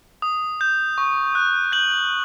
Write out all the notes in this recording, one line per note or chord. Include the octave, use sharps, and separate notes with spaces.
D#6
G6
C#6
F#6
G6 F#7